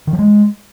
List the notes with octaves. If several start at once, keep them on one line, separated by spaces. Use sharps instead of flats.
D#3
F3
G#3